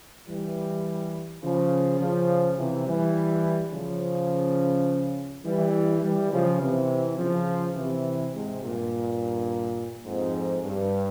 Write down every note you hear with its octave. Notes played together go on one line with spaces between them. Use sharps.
E3 G3
C#3 F3
C#3 F3
C3 E3
E3 G3
C#3 F3
E3 G3
E3 G3
C#3 F3
C3 E3
C#3 F3
C3 E3
G#2 C3
G2 A#2
F2 G#2
G2